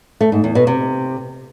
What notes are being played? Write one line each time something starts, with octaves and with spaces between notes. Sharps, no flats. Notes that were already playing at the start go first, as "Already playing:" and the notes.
A3
G#2
E2
B2
C3